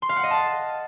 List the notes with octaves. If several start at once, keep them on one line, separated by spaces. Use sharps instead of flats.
C6
F5
F#5
D#5
A5